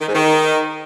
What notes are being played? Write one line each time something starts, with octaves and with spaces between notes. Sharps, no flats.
D#3
G#2
D#3